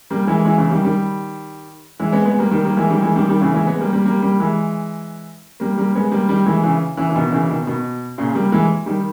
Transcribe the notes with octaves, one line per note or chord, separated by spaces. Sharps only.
G3 A#3
E3 G#3
E3 G#3
C#3 E3
D#3 G3
D#3 G3
E3 G#3
G#3 B3
G#3 B3
G3 A#3
D#3 G3
G3 A#3
E3 G#3
D#3 G3
E3 G#3
D#3 G3
D#3 G3
C#3 E3
E3 G#3
G#3 B3
G3 A#3
G3 A#3
G3 A#3
G3 A#3
E3 G#3
G3 A#3
G3 A#3
G#3 B3
G3 A#3
D#3 G3
E3 G#3
C#3 E3
C#3 E3
E3
B2 D#3
C#3 E3
B2 D#3
B2
A#2 C#3
G3 A#3
E3 G#3
D#3 G3